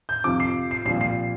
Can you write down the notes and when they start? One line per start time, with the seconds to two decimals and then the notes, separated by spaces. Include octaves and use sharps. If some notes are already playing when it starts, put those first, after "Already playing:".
0.09 G6
0.24 F2 C3 F3 D6
0.40 C7
0.71 C7
0.85 C2 A#2 F3 C7
1.01 C7